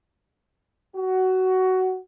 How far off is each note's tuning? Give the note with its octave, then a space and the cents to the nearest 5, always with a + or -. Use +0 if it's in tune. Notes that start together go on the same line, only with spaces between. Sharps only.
F#4 +15